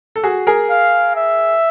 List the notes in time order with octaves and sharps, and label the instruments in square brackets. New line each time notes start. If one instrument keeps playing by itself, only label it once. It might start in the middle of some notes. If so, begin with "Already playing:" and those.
[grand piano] A4
F#4 G#4
G#4 A#4
[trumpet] F5
E5